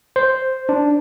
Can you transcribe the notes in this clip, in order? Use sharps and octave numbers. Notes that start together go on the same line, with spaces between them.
C5
D4